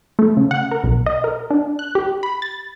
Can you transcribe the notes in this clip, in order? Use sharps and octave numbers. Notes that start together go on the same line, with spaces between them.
A3
C#3
F#5
A#4
B1
D#5
A#4
D4
F#6
G4
B5
A6